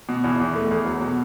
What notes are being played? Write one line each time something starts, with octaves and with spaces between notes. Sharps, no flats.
B2
E2
E2
A3
E2
F#3
B2